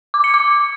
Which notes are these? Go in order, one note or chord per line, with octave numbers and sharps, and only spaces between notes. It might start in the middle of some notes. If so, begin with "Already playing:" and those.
D6
C#7
D6